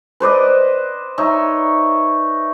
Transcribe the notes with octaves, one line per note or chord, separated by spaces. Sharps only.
B4 C5 D5 D#5
D#4 C#5 E5